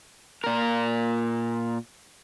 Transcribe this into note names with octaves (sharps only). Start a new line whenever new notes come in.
A#2 A#4